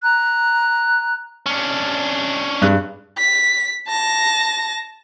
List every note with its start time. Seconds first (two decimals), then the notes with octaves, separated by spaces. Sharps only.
0.03 A#5 F#6
1.46 C#4 D4
2.62 G2 G#3 F#6
3.18 B6
3.88 A5 A#6